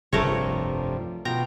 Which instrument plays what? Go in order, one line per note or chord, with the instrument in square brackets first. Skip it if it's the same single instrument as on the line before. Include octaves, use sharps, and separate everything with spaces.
[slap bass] F1 C2 C3 [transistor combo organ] G2 F3 [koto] A3 A#4 C#5
[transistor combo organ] B2 F4 G5 [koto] A#5